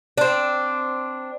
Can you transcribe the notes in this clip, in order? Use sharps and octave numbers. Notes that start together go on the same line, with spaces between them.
C4 D4